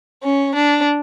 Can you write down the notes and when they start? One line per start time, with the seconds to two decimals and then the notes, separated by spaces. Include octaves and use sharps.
0.23 C#4
0.55 D4